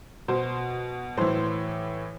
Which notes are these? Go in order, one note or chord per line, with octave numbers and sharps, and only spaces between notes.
B2 C5
A2 E3 C5